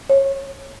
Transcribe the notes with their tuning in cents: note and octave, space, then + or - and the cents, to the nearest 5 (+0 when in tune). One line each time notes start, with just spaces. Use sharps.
C#5 -25